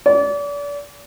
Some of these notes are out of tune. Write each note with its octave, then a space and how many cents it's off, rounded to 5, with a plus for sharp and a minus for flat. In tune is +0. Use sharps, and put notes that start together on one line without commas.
D5 -35